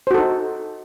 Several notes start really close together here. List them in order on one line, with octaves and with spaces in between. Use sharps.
C5 F#4 A4 D#4